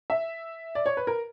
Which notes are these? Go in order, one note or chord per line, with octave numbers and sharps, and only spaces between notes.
E5
D5
C#5
B4
A#4